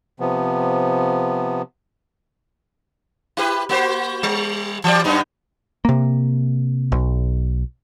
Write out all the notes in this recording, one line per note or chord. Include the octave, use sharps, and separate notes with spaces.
C3 F3 B3
E4 G4 B4
A#3 F#4 C5
G3
E3 G4 D5
F#2 B3 D#4
C3 A#3
B1